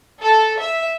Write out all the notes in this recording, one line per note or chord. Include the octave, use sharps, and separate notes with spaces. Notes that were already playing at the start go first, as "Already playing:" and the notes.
A4
E5